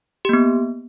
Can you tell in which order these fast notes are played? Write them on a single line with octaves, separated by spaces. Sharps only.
G4 A#3 B3